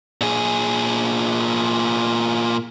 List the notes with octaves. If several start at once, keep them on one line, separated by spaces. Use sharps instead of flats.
A#2 G#4